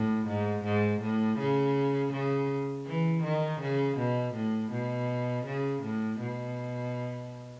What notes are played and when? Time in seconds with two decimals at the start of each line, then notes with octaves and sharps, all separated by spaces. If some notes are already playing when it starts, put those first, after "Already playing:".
Already playing: A2
0.27 G#2
0.64 G#2
1.01 A2
1.39 C#3
2.13 C#3
2.86 E3
3.23 D#3
3.61 C#3
3.98 B2
4.35 A2
4.72 B2
5.46 C#3
5.83 A2
6.20 B2